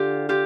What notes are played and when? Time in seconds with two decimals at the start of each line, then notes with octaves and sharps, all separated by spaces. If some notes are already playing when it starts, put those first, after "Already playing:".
Already playing: D3 F4 G4
0.29 F4 G4